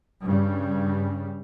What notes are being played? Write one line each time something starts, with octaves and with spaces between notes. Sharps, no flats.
G2 C#3 G3